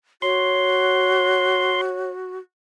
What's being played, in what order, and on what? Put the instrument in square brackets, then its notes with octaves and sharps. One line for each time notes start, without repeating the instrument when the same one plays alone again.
[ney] F#4 [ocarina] C#5 [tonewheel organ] C6